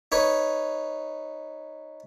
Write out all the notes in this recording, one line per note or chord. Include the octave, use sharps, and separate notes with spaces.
D#4 B4 C#5